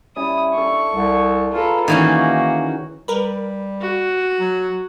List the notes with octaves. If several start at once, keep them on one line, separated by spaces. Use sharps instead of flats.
G3 C#4 E4 D#6
D4 A4 C#6
C2
F4 G#4 A4 B4 A#5
D#3 E3 A#3 C#4 F#4
G3 A#4 B4
F#4
F#3